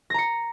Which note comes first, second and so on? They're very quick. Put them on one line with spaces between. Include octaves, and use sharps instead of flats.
A#6 A#5 C#7